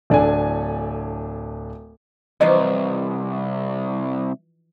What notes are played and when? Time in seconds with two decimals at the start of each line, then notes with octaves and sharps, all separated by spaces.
0.10 D1 D4 A4 G#5
2.41 C2 E3 F3 D#4 D#5